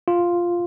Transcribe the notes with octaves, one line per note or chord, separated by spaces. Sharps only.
F4